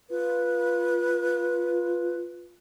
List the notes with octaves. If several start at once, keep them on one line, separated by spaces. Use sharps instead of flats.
F4 B4